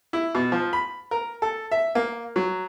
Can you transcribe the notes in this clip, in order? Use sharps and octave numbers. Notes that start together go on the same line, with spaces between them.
E4
B2
F3
B5
A#4
A4
E5
A#3
F#3